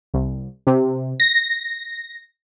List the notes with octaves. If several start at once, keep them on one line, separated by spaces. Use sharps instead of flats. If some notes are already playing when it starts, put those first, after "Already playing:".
C2
C3
A#6